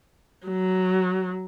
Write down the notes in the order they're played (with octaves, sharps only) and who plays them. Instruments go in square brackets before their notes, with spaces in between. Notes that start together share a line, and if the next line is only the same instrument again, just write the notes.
[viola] F#3